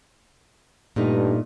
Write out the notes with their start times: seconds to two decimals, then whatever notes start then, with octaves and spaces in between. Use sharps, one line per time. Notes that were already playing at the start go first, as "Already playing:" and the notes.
0.96 G2 A#2 A3 D#4